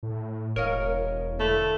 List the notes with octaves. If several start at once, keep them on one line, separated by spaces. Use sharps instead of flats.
A2
E1 A#4 C#5 D#5 F5
D3 A3 E4